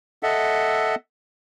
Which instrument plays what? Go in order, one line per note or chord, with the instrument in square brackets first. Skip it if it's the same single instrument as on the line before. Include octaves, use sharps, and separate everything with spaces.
[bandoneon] A4 D#5 E5 F#5